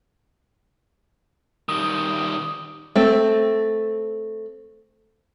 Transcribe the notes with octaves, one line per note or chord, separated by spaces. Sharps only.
D#3 G3 D#6
A3 C4